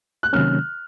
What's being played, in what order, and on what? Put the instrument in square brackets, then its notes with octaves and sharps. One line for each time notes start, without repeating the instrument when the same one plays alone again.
[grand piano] F#6
[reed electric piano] C3 D#3 F#3 A#3 C#4 [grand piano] F6